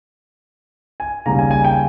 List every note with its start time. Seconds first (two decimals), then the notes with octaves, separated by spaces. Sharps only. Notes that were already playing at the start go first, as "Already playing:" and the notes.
1.00 G#5
1.26 D#2 C#3 G3 A#3 A#5
1.39 G#5
1.51 G#5
1.64 G5